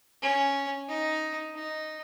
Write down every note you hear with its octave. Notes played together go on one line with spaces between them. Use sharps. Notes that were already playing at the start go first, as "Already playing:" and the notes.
C#4
D#4
D#4